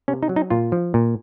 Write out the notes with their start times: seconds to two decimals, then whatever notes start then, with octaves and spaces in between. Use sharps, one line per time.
0.08 C3 C#4
0.23 D#4
0.29 F#3
0.36 D#4
0.50 A#2 F4
0.72 F3
0.94 A#2